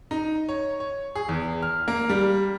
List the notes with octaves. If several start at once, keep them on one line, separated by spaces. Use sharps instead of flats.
D#4
C#5
C#5
G#4
E2
F6
A#3
G3